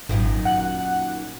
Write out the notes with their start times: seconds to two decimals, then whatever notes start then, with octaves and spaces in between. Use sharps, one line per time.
0.09 G#1 F#2 A#2 D#3
0.45 F#5 F#6